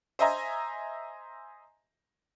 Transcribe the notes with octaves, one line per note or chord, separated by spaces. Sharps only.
C5 D#5 E5 G#5 A#5